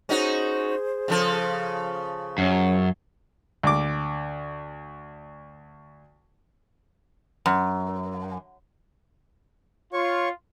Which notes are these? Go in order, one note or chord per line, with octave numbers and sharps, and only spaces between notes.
C#4 D#4 F#4 G#4 C5
C#3 F3 A4
F#2 C#4
D2 D6
F#2
F4 C#5 C#6